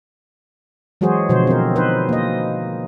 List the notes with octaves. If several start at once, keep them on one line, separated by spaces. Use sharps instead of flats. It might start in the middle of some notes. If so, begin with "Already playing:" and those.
E3 F#3 G#3 F#4 G#4 C5
B2 D3 F3 C5
C4 A#4
D#4 B4 C5
A#3 D#5